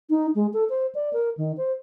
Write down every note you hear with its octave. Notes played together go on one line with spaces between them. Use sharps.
D#4
G#3
A4
C5
D5
A#4
D#3
C5